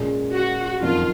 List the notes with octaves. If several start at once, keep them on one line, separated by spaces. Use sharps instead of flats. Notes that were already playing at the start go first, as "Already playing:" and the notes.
Already playing: A#2 G#3 C#4 G#4
F#4
F#1 F2 D#3 A#3 F4